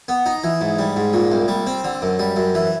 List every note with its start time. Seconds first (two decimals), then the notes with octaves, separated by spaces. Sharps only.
0.08 B3
0.26 D#4
0.44 E3
0.61 G#2
0.79 G3
0.96 G#2
1.13 A#2
1.32 C2
1.48 G3
1.67 C4
1.84 D3
2.02 F#2
2.19 G3
2.36 F#2
2.55 E3